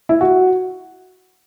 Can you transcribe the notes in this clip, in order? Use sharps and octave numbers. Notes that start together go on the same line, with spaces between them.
E4
F#4